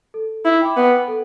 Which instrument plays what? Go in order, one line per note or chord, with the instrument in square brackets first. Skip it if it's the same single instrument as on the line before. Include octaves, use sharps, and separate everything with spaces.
[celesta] A4
[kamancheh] E4
[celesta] G5 B5 D6
[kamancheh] B3
[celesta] A4